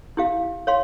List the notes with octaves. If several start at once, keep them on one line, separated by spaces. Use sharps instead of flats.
E4 G4 F5
C#5 F5 C6